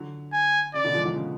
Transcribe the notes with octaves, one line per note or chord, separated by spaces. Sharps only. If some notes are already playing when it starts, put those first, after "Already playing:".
Already playing: D3 F#3
G#5
C#3 D5
B2 D3
F3 G#3
D3 F#3
C#3 F3